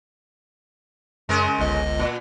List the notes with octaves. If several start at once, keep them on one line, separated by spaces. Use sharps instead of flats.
F#2 C#3 G#3 A#4
G1 C#2 D#5
A#2